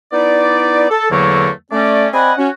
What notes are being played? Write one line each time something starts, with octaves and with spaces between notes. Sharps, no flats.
B3 D#4 E4 D5
A4
E2 D3 F#3 A3 A#3 C#6
A3 C#4 D5
C4 D5 D#5 F#5 G#5 B5
C#4 F#4